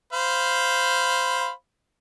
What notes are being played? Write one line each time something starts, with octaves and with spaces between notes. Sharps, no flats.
C5 F5 B5